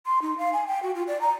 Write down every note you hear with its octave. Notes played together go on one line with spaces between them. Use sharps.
C6
D#4
F5
G#5
G5
F#4
F4
D5
A#5